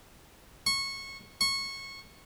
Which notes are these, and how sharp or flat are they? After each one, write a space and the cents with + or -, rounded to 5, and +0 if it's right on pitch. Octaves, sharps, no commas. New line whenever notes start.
C#6 -20
C#6 -20